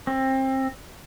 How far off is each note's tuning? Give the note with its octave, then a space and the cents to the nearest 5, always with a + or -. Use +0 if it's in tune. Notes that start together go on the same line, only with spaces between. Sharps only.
C4 +25